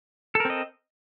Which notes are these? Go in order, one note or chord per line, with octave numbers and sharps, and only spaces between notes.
C4 A4 A#4 D#5